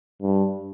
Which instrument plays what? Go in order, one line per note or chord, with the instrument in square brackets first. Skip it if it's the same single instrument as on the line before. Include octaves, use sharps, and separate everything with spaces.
[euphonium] G2